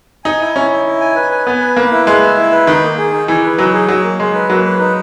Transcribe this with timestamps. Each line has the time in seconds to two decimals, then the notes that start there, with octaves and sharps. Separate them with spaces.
0.24 D#4 G#5
0.41 E4
0.55 C#4 E4
0.71 E4
0.85 E4
1.00 G#5
1.16 B4
1.31 G#5
1.46 B3 G#5
1.61 B4
1.76 A#3 B4
1.91 E4
2.06 G#3 B4
2.22 E5
2.38 E4
2.52 B4
2.67 D#3 D#4
2.83 A#3
2.98 G#4
3.13 D#4
3.28 E3 G#4
3.43 B4
3.58 F#3 D#4
3.73 G#4
3.88 F#3 D#4
4.03 A#3
4.19 G#3 D#4
4.34 B4
4.49 F#3 A#3
4.65 B4
4.79 D#4